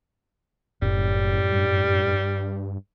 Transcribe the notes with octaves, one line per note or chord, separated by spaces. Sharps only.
F#1 F#2 A2 G3
G2